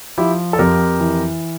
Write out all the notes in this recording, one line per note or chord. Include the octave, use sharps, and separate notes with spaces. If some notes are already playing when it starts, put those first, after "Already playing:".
F3 E4 G4
A4
F2 G4 A#4
E3